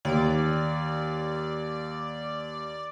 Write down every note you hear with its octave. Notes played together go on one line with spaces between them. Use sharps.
D#2 D5